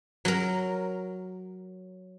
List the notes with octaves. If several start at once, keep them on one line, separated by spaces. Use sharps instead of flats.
F#3 A#4